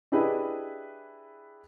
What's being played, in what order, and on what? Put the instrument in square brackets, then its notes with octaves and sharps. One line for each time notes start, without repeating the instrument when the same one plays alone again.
[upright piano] D4 E4 G4 G#4 B4 D#5